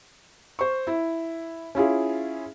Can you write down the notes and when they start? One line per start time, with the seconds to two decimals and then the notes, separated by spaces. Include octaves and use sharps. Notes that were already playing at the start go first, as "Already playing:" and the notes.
0.59 C5 C#6
0.87 E4
1.75 C#4 E4 F4 G#4